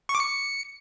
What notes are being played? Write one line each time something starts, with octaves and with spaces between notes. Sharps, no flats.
C#6
D6
C#7